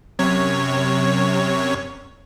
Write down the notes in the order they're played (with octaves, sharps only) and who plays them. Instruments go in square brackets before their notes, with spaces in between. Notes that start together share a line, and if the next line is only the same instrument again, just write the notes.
[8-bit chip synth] F#2 C3 C#5